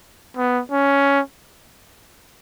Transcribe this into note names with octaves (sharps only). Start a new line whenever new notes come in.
B3
C#4